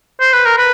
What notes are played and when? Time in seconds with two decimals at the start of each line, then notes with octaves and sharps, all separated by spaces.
0.20 C5
0.33 B4
0.46 A#4
0.58 B4